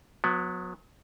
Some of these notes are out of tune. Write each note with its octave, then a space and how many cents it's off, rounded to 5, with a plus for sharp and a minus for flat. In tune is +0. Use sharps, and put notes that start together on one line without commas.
F#3 -30 B3 +0